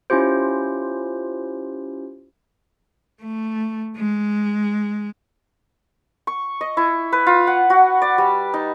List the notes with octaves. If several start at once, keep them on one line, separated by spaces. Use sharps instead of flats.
C#4 E4 F4 G4 C5
A3
G#3
C#6
D#5
E4
B4
F4
F#5
F#4
D5
G3
D#4